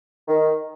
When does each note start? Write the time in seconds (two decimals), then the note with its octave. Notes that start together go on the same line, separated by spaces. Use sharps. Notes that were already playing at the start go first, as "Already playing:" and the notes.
0.28 D#3